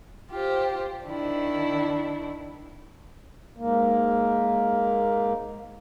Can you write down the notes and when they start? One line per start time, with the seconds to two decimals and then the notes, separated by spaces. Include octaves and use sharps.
0.31 F4 G4 C5
1.06 D#3 D4 E4
3.57 G#2 A#3